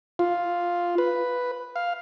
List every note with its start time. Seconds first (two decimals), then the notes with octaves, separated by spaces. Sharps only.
0.19 F4
0.98 B4
1.76 F5